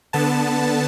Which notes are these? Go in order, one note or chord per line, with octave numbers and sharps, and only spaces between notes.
D3 B3 A5